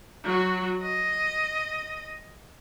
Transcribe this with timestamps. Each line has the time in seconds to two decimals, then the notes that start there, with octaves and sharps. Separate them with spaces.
0.24 F#3 F#4
0.82 D#5